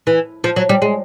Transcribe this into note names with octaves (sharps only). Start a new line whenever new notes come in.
E3
F3
F#3
G3
G#3